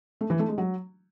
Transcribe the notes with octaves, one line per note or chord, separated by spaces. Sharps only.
A3
E3
A3
G#3
F#3